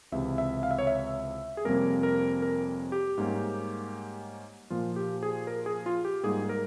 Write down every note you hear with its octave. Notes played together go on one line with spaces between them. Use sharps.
C#2 C3 E3 E5
E5
F5
E5
C#5
E5
G#4
F2 C3 G3 A#3 C#4 A#4
A#4
A#4
G4
G#2 G3 A#3 C#4
A#2 F3 A#3 F4
G4
G#4
A#4
G#4
F4
G4
G#2 G3 A#3 G#4
A#4